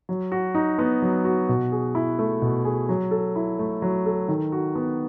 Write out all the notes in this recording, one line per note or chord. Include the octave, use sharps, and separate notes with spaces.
F#3
F#4
D#4
B3
F#3
F#4
B2
G#4
E4
A3
B2
G#4
F#3
A4
E4
A3
F#3
A4
D#3
F#4
B3